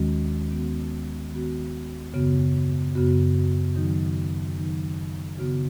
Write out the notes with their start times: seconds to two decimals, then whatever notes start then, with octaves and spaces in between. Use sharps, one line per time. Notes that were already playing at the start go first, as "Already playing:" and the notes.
Already playing: D#2 D#3 G#3 C#4 F#4
0.50 D#3 B3 F#4
1.32 D#3 B3 F#4
2.13 F#2 C#3 B3 F#4
2.95 F#2 C#3 B3 F#4
3.76 D#3 F#3 D#4
4.57 D#3 F#3 D#4
5.39 C#3 B3 F#4